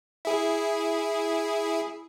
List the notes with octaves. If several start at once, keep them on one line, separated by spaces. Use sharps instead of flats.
E4 G#4